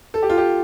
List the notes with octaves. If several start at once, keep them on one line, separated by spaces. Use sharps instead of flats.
A4
G4
F4
G4